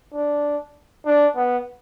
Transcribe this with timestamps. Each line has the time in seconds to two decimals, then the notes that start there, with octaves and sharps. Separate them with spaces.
0.14 D4
1.06 D4
1.36 B3